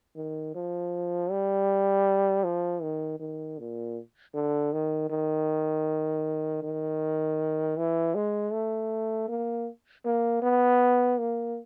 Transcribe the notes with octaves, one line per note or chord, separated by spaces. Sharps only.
D#3
F3
G3
F3
D#3
D#3
A#2
D3
D#3
D#3
D#3
E3
G#3
A3
A#3
A#3
B3
A#3